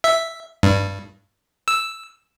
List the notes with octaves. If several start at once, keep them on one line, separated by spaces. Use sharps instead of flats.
E5
G2
E6